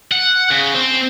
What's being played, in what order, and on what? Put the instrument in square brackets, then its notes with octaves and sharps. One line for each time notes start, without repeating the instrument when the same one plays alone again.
[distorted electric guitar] F#5
C#3
C4